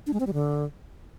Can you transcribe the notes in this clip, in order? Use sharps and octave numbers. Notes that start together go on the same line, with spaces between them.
D4
G#3
C4
G3
D3